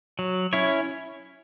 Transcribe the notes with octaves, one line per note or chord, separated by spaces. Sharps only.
F#3
C#4 E4 C#5